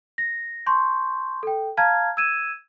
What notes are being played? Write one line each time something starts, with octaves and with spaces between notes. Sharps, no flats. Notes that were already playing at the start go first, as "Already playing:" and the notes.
A#6
A5 C6 C#6 G6
A4 G5
F5 A5 A#5 F6 G#6
E6 G#6 D#7 E7